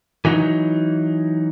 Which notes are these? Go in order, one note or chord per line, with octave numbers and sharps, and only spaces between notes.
E3 F#3 D#4